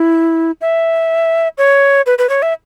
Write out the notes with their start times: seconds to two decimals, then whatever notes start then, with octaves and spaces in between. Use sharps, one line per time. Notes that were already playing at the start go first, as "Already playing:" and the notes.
Already playing: E4
0.61 E5
1.58 C#5
2.06 B4
2.18 B4
2.29 C#5
2.42 E5